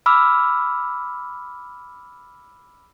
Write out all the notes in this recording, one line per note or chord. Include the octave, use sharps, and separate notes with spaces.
B5 D6 E6 F6